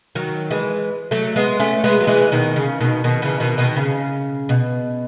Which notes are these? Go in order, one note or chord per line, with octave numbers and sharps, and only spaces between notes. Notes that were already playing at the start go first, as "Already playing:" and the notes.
D#3 F#3
E3 G#3
F#3 A3
G#3 B3
A3 C#4
G#3 B3
F#3
E3 G#3
B2 D#3
C#3
B2 D#3
B2 D#3
C#3 E3
B2 D#3
B2 D#3
C#3
B2